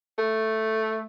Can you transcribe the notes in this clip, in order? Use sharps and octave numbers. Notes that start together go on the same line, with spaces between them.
A3